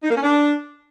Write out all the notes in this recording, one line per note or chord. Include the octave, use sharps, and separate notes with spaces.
D#4
A#3
C#4
D4